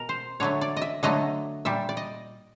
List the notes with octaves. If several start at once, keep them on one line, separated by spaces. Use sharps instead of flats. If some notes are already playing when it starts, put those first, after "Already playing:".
Already playing: B2 A#4
C5
D3 F#3 A3 C#5
D5
D#5
E5
D3 F#3 A3 D#5
A#2 G3 E5
D5
D#5